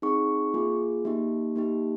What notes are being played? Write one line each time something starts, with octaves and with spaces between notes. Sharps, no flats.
C4 D#4 G#4 C#6
A#3 F4 G#4
A#3 D#4 G4
A#3 D#4 G4